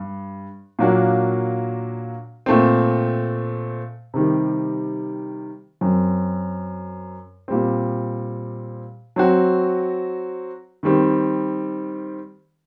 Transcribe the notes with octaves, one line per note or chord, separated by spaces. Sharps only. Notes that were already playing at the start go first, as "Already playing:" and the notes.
Already playing: G2
A#2 F#3 A#3 D4 F#4
A#2 A3 C4
C3 D#3 G3
F#2 F#3 C4
A#2 G3 C4
F#3 C4 F#4
D#3 G3 C4